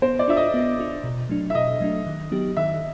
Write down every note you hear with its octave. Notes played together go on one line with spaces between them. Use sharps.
B3 C5
D5
D4 F4 E5
D#5
B3
D4 F4
B2
F#3 A3 D4
E5
B2 D#5
F#3 A3 D4
D#3
F#3 B3 D#4 G4
D#3 E5